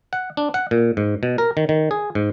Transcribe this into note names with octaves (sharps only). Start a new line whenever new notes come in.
F#5
D4
F#5
A#2
G#2
B2
A#4
D#3
D#3
G#4
G#2